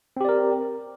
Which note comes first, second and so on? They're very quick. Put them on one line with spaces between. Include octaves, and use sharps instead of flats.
C4 G4 D5 A#4